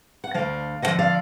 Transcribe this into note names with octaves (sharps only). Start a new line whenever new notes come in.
F#5
D2 D3 F3 D5 F5
D2 D3 F3 D#5 F#5
D5 F5